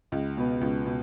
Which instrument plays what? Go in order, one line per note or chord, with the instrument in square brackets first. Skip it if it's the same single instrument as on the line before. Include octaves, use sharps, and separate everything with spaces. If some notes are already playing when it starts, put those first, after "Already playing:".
[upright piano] C#2
B2 B3
C#2
B2